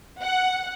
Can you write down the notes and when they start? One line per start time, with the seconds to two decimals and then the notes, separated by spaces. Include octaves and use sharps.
0.21 F#5